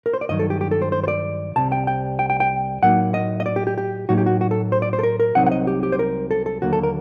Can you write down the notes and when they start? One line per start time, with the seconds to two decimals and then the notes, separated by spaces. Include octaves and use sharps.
0.06 A#4
0.13 C5
0.21 D5
0.29 G2 D#3 F#3 D#5
0.39 A4
0.50 G4
0.61 G4
0.71 A4
0.82 C5
0.92 C5
1.04 C5
1.08 D5
1.56 C2 C3 G3 A5
1.72 G5
1.87 G5
2.19 G5
2.30 G5
2.40 G5
2.82 A2 F#3 A#3 D#4 F#5
3.14 D#5
3.40 D#5
3.46 D5
3.56 G4
3.67 G4
3.78 G4
4.09 A2 F#3 A#3 D#4 F#4
4.18 G4
4.26 F#4
4.41 F#4
4.51 A4
4.72 C5
4.82 D5
4.93 C5
4.99 A4
5.03 A#4
5.20 A#4
5.35 C2 C3 F#3 C4 D#4 F#5
5.46 F#5
5.52 D#5
5.67 G4
5.83 G4
5.92 C5
5.99 A#4
6.31 A4
6.46 A4
6.62 D#2 D3 F#3 A#3 F#4
6.73 A4
6.83 A#4